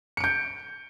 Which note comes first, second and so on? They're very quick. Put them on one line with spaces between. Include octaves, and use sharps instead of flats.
C#7 D7 G6